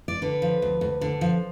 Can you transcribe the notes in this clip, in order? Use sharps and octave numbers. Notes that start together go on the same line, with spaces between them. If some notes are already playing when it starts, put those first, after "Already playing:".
D5
D3 B4
F3
D2
D2
D3
F3